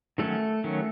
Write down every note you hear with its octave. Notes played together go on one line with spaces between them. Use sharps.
D#3 F#3 A3 C#4 A4
D#3 F#3 C#4